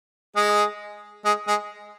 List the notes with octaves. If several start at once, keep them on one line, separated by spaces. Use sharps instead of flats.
G#3 G#4
G#3 G#4
G#3 G#4